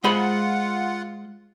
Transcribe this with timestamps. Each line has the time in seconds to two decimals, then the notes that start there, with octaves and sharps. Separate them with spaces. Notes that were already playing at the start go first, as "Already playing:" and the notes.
0.04 G#3 F4 C5 F#5 B5